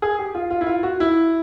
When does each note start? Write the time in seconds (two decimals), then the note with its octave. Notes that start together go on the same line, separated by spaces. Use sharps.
0.02 G#4
0.19 G4
0.35 F4
0.51 F4
0.61 E4
0.67 F4
0.83 F#4
1.00 E4